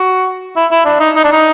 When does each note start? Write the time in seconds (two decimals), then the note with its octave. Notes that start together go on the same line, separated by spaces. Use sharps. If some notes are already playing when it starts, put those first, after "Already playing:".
Already playing: F#4
0.56 E4
0.71 E4
0.85 D4
1.00 D#4
1.15 D#4
1.24 D4
1.32 D#4